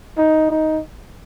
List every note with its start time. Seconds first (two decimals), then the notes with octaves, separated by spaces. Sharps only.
0.18 D#4
0.51 D#4